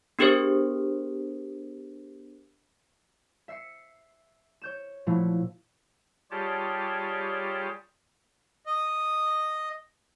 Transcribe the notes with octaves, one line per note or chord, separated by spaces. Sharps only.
B3 D4 G4 G#4 A#4 C5
E5 C7 C#7
C#5 G6 E7
A#2 F3 F#3 A3 E4
G3 F4 G4 G#4 C#5 A5
D#5